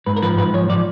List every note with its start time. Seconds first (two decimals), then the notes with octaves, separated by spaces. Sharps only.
0.06 G#2 B4
0.17 A#4
0.22 F3 B4
0.38 G#2 B4
0.54 F3 C#5
0.69 F3 D5